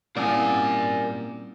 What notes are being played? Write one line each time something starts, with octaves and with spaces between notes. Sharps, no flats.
A#2 G3 C4 C#4 E4 A#4 D5 G#5